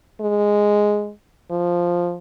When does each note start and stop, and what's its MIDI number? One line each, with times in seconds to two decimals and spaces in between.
0.21 1.11 56
1.51 2.17 53